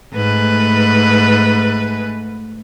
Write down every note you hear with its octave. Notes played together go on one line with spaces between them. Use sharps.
G#2 A3 B4